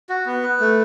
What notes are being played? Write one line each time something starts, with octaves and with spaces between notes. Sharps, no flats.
F#4
B3
B4
A3